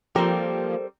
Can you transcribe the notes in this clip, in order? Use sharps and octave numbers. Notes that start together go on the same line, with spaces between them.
F3 G3 A#3 C4 G4 A4 A#4 C5